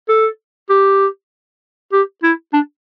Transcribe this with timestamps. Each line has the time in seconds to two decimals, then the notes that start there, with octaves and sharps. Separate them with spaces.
0.09 A4
0.70 G4
1.93 G4
2.23 E4
2.53 D4